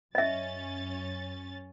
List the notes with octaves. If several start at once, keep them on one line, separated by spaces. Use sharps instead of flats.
F#2 C#4 D#5 E5 A6